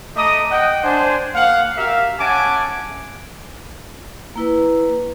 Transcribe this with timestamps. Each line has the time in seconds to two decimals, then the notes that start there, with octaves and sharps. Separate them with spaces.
0.16 A3 D#5 A#5 D6 D#6
0.51 D#5 F#5 G5
0.84 D4 C5 G#5
1.35 A#3 F5 F#5
1.77 F#4 G4 A#4 E5 F5
2.20 C#4 E5 F#5 G#5 A5 D6
4.36 A#3 E4 B4